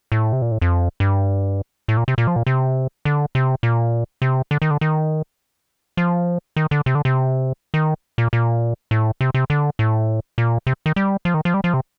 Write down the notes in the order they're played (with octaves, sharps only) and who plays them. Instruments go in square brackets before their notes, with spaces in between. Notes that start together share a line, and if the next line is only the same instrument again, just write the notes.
[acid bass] A2
C3
A#2
A2
F2
G2
A2
A#2
C3
A#2
F3
A#2
C3
D3
C3
A#2
C3
D3
D#3
D3
D#3
F3
D#3
D3
C3
D3
C3
D#3
A#2
A#2
A2
C3
C3
D3
A2
A#2
C3
D#3
G3
F3
D#3
F3
G3
F3
C3